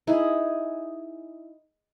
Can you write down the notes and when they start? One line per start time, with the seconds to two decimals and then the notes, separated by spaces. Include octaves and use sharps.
0.07 D#4 E4 G#4 E5